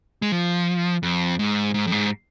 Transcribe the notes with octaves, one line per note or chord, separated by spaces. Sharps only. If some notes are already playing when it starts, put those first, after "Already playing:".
G#3
F3
F2
G#2
G#2
F2
G#2